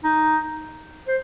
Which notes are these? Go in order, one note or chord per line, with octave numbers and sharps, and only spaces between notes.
D#4
C5